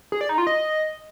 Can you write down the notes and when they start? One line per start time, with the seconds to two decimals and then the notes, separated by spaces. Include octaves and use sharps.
0.12 G#4
0.21 D5
0.29 D#4
0.38 F4
0.47 D#5